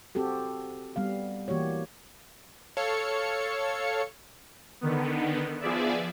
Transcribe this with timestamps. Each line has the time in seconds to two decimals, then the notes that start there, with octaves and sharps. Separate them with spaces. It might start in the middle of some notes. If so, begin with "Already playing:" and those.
0.15 C4 F#4 G4 A4
0.96 G3 B3 F5
1.48 E3 A#3 F#4 G4 C#5
2.77 A4 C#5 F5 C#7
4.81 D3 D#3 B3
5.61 F3 B3 G#4 D5 E5